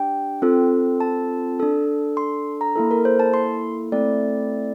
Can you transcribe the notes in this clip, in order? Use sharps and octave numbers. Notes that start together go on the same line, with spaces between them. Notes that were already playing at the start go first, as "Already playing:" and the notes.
Already playing: D4 G4 G5
C4 F4 A4
A5
D4 A4
C6
A#5
A#3 E4 A4
A#4
C5
A5
C6
A3 C4 E4 A4 D5